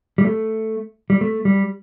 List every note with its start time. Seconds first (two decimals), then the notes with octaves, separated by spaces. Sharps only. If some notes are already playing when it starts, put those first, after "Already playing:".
0.18 G3
0.25 A3
1.10 G3
1.21 A3
1.45 G3